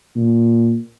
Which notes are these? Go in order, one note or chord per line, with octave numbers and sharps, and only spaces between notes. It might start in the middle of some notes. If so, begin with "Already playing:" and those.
A#2